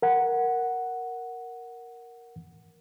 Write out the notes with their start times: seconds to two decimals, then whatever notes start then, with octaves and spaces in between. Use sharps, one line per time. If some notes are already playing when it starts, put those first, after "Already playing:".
0.02 A#4 F#5